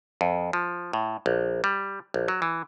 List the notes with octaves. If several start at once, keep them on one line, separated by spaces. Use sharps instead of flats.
F2
F3
A2
A#1
G3
A#1
F#3
E3